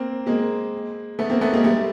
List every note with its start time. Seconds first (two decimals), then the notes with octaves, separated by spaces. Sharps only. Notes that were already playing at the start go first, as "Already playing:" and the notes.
Already playing: A#3 C4
0.26 G#3 A#3
1.19 A3 B3
1.30 A#3 C4
1.41 A3 B3
1.53 G#3 A#3
1.64 G3 A3